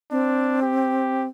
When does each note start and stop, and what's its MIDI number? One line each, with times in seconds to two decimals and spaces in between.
0.11 1.27 60
0.11 0.59 62
0.62 1.26 67